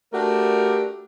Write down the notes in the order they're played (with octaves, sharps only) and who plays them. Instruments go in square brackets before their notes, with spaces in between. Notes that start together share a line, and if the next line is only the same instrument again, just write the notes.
[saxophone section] A3 D4 F#4 G4 A#4